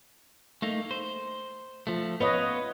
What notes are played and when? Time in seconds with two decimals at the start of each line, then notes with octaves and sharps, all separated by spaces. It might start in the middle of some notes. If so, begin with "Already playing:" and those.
0.62 A3 A#3 D#4
0.91 C5
1.87 F3 A3
2.20 B3 F4 B4 C#5 D#5